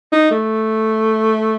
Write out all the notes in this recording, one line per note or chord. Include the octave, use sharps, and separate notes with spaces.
D#4
A3